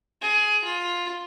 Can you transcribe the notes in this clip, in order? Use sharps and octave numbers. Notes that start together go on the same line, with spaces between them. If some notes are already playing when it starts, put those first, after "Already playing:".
G#4
F4